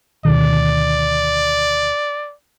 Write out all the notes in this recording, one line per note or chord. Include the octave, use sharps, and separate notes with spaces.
D2 B2 D#3 D5